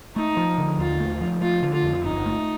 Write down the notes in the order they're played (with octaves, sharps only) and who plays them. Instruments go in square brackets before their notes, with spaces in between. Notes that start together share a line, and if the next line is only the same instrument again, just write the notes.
[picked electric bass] A3 [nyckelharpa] D#4
[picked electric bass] F3
D3
[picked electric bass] D#2 [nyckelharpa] F4
[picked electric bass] A3
F3
[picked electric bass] A3 [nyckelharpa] F4
[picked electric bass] D3
[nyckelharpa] F4
[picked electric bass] F2
[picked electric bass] G1 [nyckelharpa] D#4
[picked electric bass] A3